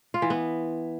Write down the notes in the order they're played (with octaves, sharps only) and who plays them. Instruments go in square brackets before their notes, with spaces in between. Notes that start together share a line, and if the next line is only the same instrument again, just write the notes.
[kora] F4
E3
B3